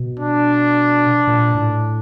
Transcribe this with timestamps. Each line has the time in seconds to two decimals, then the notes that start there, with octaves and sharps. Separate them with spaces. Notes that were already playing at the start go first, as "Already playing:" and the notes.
Already playing: B2
0.20 D4
1.27 A#2
1.55 A2